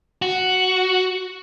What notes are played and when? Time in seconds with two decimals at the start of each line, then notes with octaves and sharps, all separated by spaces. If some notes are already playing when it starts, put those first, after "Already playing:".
0.22 F#4